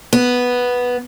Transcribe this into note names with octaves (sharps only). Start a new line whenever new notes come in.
B3